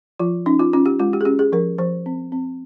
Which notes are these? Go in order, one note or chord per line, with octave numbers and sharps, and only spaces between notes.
F3 F4
C#4 D#4
F4
C#4 F4
G4
G#3 F4
G4
G#4
C#4 G4
G#4
F3 A#4
F3 C5
C4
C4